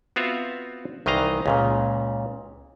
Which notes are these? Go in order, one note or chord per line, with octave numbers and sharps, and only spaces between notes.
B3 C4 F4 F#4 E5 F5
C2 D#3 E3 D#5 F5 A#5
C#2 A#2 C#3